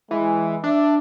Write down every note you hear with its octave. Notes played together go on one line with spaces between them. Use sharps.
E3 G#3
D4 E5